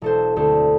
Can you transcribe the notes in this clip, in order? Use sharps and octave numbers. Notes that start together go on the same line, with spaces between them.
E1 A4 C5
D2 A4 C5